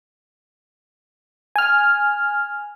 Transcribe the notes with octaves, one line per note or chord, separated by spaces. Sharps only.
G#5 F6